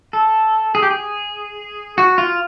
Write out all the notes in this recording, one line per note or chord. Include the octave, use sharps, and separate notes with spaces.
A4
G#4
G4
G#4
F#4
F4